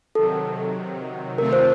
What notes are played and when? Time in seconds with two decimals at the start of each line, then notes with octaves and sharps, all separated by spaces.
0.15 C3 D#3 F#3 A4
1.38 C3 D#3 A3 C4 F4 A#4
1.53 C5